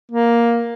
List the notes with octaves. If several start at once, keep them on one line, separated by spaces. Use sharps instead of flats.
A#3